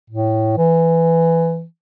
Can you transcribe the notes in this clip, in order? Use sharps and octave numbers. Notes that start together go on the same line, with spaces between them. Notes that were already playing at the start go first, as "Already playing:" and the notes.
A2
E3